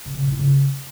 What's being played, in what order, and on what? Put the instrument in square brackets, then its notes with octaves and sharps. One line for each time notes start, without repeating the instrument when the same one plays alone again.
[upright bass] C3
C#3
A#2
E4
C#3